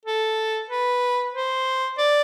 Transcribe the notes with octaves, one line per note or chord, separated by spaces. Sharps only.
A4
B4
C5
D5